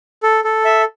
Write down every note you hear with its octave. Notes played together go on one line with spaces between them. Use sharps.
A4
A4
E5